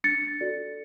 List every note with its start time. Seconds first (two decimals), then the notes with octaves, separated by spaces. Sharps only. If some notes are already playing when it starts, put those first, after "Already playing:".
0.04 D4 A6 C#7
0.41 F#4 A4 D5